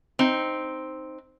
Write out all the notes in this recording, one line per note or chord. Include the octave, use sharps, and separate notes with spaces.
C4 D#4